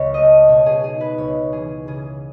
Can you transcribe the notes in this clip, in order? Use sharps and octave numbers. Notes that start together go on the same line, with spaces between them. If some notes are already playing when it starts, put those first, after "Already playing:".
Already playing: C#2 C#5
A3 D#5
B2 C#5
G#4
D#4 G#4
B4
C#2 C#5
E3 G#4
C#3 G#4